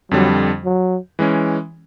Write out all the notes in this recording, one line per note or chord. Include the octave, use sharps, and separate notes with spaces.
F2 D3 F#3 G3
F#3
E3 G#3 C#4